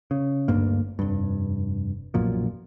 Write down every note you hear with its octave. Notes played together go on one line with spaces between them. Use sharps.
C#3
G1 D2 G2 A#3
F1 G2
B1 F#2 A#2 F3